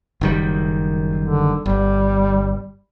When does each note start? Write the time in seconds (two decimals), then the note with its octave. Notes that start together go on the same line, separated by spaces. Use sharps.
0.21 F#1 D#3 G3
1.25 D3
1.66 G1 G3